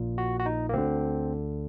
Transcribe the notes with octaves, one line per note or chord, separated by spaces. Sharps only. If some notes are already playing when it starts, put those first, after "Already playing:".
Already playing: A#1 A#2
F#4
F#4
D#4
A#3
D2 D3 C4